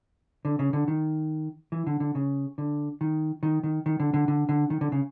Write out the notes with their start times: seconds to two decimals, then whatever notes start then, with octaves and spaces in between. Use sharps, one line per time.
0.45 D3
0.59 C#3
0.73 D3
0.88 D#3
1.72 E3
1.87 D3
2.00 D3
2.15 C#3
2.58 D3
3.01 D#3
3.43 D#3
3.63 D#3
3.86 D#3
4.00 D3
4.14 D3
4.28 D3
4.49 D3
4.70 D#3
4.81 D3
4.92 C#3